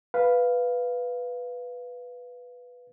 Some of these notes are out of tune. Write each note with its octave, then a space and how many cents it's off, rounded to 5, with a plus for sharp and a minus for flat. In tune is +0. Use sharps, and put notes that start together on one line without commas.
B4 +0 F5 +0